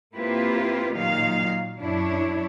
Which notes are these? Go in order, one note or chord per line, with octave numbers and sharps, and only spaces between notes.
A#3 C4 E4 F4 G4 B4
A#2 D#3 F#3 D#4 F5
F#2 D4 E4 C#5